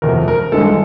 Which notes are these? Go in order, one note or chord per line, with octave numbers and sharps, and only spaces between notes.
F1 E2 C3 A#4
A#4
G#1 G2 E3 G#3 A4